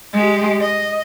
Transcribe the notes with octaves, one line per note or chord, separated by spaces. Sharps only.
G#3 G4
D#5